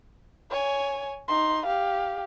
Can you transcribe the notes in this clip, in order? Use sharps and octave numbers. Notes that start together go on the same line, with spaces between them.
C#5 G#5
D#4 C6
G4 F5